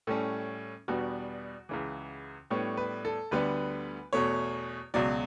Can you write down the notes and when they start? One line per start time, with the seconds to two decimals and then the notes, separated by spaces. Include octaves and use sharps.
0.07 A2 G3 C#4 A4
0.88 E2 B2 G3 B3 D4 F#4
1.69 C#2 C#3 E3
2.50 A2 G3 B3 D4 C#5
2.77 B4
3.05 A4
3.31 D2 D3 G3 B3 B4
4.13 E2 B2 A3 C#5
4.94 C#2 B2 F#3 D5